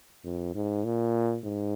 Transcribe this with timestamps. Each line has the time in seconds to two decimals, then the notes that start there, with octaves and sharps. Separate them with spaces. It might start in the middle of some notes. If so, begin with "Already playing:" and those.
0.24 F2
0.55 G#2
0.85 A#2
1.44 G#2